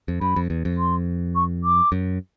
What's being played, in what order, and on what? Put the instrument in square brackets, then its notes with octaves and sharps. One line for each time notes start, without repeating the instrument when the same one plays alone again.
[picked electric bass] F2
[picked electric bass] F#2 [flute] B5
[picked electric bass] F2
E2
F2
[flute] C6
C#6
D6
[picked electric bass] F#2